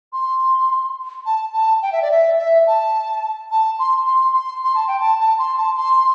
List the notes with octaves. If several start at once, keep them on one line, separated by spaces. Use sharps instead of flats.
C6
A5
A5
G5
E5
D5
E5
E5
A5
A5
C6
C6
C6
C6
A5
G5
A5
A5
C6
A5
C6